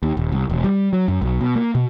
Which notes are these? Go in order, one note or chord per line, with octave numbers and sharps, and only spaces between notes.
D#2
D#1
C2
E1
G3
F#3
F#2
B1
B2
A#3
B2